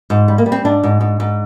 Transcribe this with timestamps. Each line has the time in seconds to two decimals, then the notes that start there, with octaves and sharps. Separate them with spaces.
0.10 G#2
0.28 G3
0.38 A#3
0.46 G3
0.52 C4
0.65 G#2 D4
0.83 G#2
1.01 G#2
1.20 G#2